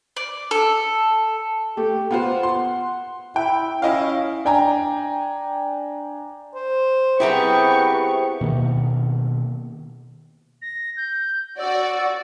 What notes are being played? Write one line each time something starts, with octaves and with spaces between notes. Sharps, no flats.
D5
A4
A3 G4
B3 F4 C5 F#5
C6
E4 G5
C#4 E4 D#5 F5
D4 G5 G#5 A#5
C5
B3 C4 E4 G4 G#4 A#4 G5 C#6
B2 D#3 A#3
A#6
G6
F#4 D5 E6